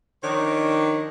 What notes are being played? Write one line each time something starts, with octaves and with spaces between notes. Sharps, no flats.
D#3 F3 D4 D#4 C#5